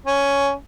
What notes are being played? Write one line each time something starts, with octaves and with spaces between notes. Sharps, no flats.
C#4